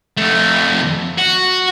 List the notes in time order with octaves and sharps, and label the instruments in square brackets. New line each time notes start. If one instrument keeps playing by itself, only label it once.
[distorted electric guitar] F2 A3
F#4